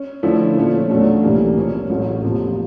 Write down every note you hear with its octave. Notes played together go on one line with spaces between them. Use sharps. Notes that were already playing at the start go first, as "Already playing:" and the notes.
Already playing: C#4
D3 F3 A3 C#4 E4
A#2 F3 A3 C#4
E2 B2 F#3 A3 D4
C2 C3 E3 G3 A#3
C3 F3 A#3 C#4
A1 A2 F#3 A3
E2 C3 F3 A#3